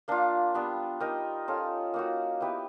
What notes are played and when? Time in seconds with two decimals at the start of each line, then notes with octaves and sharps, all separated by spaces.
0.08 A#3 D4 F4
0.54 G3 B3 D4
1.00 D#4 G4 A#4 D#5
1.48 C#4 F4 A4
1.94 A#3 D#4 F#4
2.40 B3 E4 G4 B4